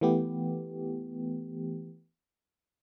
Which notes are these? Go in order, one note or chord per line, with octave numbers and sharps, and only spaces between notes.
E3 A3 B3 G4